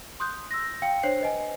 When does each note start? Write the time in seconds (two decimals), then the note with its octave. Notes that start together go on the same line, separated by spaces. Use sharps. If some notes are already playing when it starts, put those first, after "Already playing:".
0.20 C6 D#6 F#6 G6
0.51 E6 A#6
0.82 F5 G5 C#7
1.03 D4 C5 C#5 C7
1.21 B4 D#5 G#5